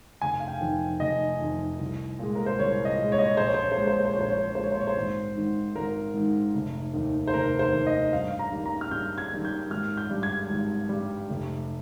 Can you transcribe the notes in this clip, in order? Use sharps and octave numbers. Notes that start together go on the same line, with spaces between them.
F1 G#5
F5
G5
F2 D#3
F1 D#5
F2 D#3
C2
A#2 G#3
A#4
C5
C2 C#5
D#5
A#2 G#3
C#5
D#5
C#5
A#1 C5
C#5
C5
C#5
C5
A#2 G#3 C#5
C5
C#5
C5
C#5
A#1 C5
C#5
C5
C#5
A#2 G#3 C5
C#5
C5
C#5
C5
G#1
G#2 D#3
G#1 A#4
G#2 D#3
F1
D#2 D#3
C5
F1 A#4
C5
D#2 D#3
D#5
G2 F5
A#5
D#3 G3 A#3
A#5
F6
G2 G6
G#6
D#3 G3 A#3
G6
G#1 F6
G6
G2 G3
G#6
G#1
G2 G3
F1